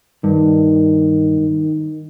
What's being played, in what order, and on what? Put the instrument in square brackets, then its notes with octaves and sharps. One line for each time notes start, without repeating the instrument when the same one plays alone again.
[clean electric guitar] G2 [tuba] D#3